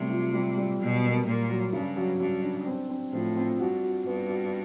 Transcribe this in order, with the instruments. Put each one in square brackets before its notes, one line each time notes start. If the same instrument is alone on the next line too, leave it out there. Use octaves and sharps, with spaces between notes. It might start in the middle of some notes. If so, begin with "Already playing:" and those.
Already playing: [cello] C3 [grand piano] F#3 G3 A3
[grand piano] F4
G3
G3
[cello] B2 [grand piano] F#3
[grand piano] A#3
[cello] A#2 [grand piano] A#3
[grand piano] F#3
[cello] G2 [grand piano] C#3
[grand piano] F#3
[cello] G2 [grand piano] F#3
[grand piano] D4
C4
C4
[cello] A2 [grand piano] F3
[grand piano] C4
[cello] G2 [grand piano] F#4
[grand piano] F#4
[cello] G2 [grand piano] B3
[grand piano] F#4